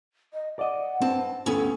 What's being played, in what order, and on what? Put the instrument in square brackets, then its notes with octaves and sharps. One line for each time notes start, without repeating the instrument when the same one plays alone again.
[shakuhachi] D#5
[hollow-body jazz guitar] D5 D#5 [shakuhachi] F#5
[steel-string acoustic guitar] G2 A5 [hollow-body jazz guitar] C4
[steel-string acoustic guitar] D2 G2 C#4 [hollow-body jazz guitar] B3 [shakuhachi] A4